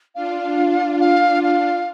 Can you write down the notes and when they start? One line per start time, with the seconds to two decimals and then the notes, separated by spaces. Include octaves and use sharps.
0.15 D4 F4 F5
1.00 F5
1.43 F5